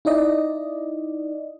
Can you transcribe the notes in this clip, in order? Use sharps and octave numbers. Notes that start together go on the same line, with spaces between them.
D#4 E4 D5 D#5